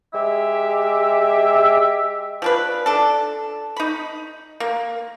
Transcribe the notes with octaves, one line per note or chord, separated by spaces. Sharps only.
G#3 G4 E5
F3 D4 B4
D4 A4
D#4 B5
A#3